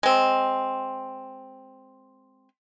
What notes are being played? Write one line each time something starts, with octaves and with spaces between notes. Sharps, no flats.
G#3 C4